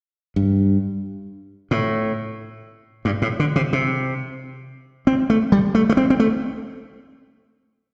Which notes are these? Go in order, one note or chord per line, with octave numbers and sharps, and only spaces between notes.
G2
A2
G2
A2
D3
C3
C3
C4
A3
G3
A3
A3
C4
C4
A3